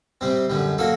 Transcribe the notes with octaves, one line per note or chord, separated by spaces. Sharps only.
C3 G3 C4
F#2 D3 G3
F#3 A#3 F#4 A4